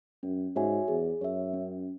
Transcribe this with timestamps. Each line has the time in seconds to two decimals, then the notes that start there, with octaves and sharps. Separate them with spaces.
0.23 F#2 C#4
0.56 G#2 F#4 C#5 E5 G#5
0.88 E2 G#4
1.21 F#2 C#5 E5
1.54 C#4